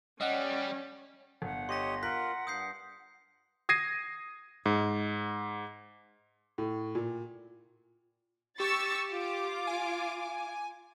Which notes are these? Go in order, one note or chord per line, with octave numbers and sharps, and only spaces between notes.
G3 C#4 D#5 F#5
G1 F#5
G4 C#5 D#5 C6 A#6
F4 A#4 F#5 F#6 B6
G2 D#6 G6 C7
D#6 G#6 A#6 C7 D#7
G#2
A2
A#2
G4 C#6 E6 A6
F4 D6
G#5